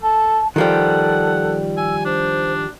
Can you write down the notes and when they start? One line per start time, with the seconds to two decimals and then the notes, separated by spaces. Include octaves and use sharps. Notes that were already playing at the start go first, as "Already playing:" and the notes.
0.03 A4 A5
0.56 D#3 F3 G3 A4 F#5
1.77 G#5 E6
2.05 D4 C5